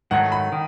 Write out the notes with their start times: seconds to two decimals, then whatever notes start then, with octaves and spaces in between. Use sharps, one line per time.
0.11 G#2 D#3 F#3 A3 F#5
0.32 B5
0.52 D#3